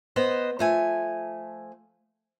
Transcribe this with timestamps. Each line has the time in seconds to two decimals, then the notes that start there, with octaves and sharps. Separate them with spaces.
0.16 B3 C5 D#5
0.59 F3 A3 G#5